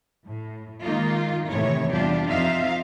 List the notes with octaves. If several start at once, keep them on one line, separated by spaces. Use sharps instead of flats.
A2
D#3 G#3 A#3 D#4 F4
A2 C3 D#3 E3 C#5
E2 C3 G3 D4 F4 G4
F2 C4 D#4 F4 E5 F5